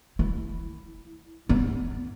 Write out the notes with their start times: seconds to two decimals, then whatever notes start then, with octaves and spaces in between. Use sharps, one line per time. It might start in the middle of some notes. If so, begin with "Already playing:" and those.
0.19 E4
1.49 B3